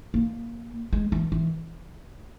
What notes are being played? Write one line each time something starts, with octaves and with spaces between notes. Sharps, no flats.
A#3
G#3
E3
E3